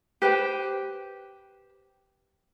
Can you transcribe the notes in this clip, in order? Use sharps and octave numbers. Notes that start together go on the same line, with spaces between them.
G4 B4 C5 G5